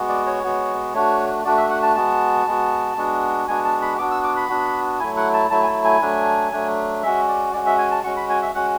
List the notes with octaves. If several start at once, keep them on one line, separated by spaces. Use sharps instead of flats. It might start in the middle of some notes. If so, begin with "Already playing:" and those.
Already playing: G#3 B3 F#4
D5
C#5
G#3 B3 F#4
A3 D4 F#4 C#5
A3 D4 F#4 D5
E5
F#5
A5
G#3 B3 F#4 A5
G#3 B3 F#4
G#3 B3 D4 F#4
G#3 B3 D4 F#4 G#5
A5
B5
B3 D4 F#4 D6
E6
D6
B5
B3 D4 F#4
F#3 A3 E4 G#5
F#5
A5
F#3 A3 E4 A5
G#5
A5
G#5
F#3 A3 D4
F#3 A3 D4
G#3 C#4 F#4 E5
D5
G#3 C#4 F#4 D5
E5
G#5
A5
G#3 C#4 F#4 C#6
B5
G#5
E5
G#3 C#4 F#4 F#5